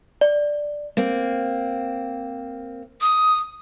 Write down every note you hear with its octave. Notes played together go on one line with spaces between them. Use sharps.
D5
A#3 C4
D#6